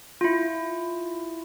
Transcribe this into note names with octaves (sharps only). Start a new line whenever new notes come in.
E4 F4